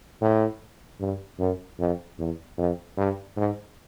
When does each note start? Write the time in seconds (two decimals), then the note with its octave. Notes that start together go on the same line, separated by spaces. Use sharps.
0.21 A2
1.00 G2
1.39 F#2
1.79 F2
2.19 E2
2.58 F2
2.97 G2
3.37 G#2